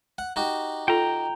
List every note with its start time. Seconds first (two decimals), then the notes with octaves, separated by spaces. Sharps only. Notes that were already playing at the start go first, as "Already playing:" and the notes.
0.18 F#5
0.36 D#4 F#4 G4
0.88 F4 A4 G5 A#5